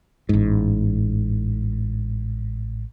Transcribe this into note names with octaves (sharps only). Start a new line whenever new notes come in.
A1 G#2